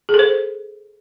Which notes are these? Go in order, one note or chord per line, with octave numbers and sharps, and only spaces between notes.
G#4
A4
C5